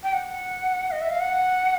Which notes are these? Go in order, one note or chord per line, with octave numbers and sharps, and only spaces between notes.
G5
F#5
D#5
E5
F5
F#5